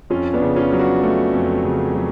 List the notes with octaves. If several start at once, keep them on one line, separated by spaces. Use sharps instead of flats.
F2 C#4 F4
B3 D4
C#3
C#4 F4
F#3
D4 F#4
A3
F2
C#3
F#3